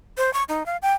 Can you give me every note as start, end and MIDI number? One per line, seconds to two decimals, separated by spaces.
0.17 0.33 72
0.33 0.43 85
0.49 0.66 63
0.66 0.77 77
0.82 0.94 79